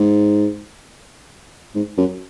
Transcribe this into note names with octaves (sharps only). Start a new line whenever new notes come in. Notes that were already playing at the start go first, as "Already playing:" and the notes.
Already playing: G#2
G#2
F#2